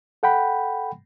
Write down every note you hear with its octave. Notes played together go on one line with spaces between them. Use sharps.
A4 F#5 G5 B5